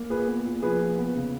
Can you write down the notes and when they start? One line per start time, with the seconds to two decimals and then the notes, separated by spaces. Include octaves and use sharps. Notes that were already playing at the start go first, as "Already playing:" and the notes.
Already playing: A#3
0.10 A#2 G#4 B4
0.28 B3
0.45 A#2
0.62 F3 G#4 B4
0.80 A#2
0.98 B3
1.15 C#3